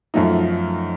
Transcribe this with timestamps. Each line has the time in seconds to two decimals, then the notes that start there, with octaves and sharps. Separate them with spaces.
0.14 F#2 F3 A3 D#4